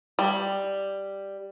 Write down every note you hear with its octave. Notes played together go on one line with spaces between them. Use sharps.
G3